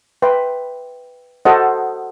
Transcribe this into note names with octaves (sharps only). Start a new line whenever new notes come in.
B4 E5 G5 C6
F#4 A4 C5 D#5 F#5